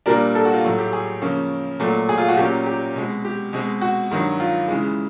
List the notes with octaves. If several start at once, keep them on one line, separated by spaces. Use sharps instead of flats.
A#2 G3 A#3 D4 A#4
A4
F#4
F4
A2 F#3 A3
G4
G#4
C#3 F3 A#3 C#4
A#2 F#3 A3
G#4
F4
F#4
A#2 F#3 A#3 C#4 G4
G4
B2 G#3 C4
G4
B2 G#3 C4
F#4
G2 D#3 F#3
F4
C#3 E3 G#3